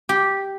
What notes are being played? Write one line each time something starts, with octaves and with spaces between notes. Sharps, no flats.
G4